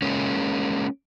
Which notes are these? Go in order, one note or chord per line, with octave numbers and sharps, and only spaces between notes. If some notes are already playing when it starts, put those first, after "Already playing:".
G#3 A#3 C#4